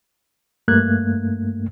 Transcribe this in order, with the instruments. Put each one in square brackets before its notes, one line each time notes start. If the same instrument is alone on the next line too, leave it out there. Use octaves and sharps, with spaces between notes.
[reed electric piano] G2 A3 A#3 F#6 G#6